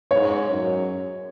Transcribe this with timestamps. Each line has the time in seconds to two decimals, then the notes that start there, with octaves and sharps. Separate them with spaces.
0.11 G#2 C#5
0.50 F#2